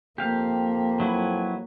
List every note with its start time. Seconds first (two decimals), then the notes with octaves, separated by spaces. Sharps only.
0.18 F2 A#3 G4 F5
1.00 F#3 E4 B4